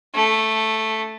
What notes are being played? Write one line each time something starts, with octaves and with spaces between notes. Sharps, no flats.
A3